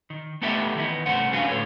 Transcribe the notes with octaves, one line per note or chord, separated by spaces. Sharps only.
D#3
A3 B3 D#4 G4 A4 E5
D#3 E3 B3 D#4
C2 G2 A3 C#4 C5 F#5
C#4 D4 F#4 G#4 B4 F5
A2 D3 G#3 A4 C#5